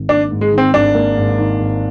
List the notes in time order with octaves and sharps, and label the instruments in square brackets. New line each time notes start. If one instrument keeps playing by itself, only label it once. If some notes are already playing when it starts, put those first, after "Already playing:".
Already playing: [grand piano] G#1 G#2 D#3
[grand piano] A#3 [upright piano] D4
[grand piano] G#2
[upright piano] G#3
[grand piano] D#3 [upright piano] C4
[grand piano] G#1 [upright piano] D4
[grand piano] A#3
G#2
D#3
G#1